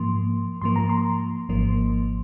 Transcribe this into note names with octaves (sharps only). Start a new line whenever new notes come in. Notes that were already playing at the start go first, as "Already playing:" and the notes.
Already playing: G#2 F3 A#3 C6
G#2 F3 A#3 C6
A#5
C6
G#1 G#2 F3 A#3